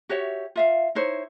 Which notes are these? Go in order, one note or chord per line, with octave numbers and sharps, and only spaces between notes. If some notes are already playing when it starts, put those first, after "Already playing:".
F#4 G4 C#5 E5
F4 E5 F5
D#4 E4 C5 C#5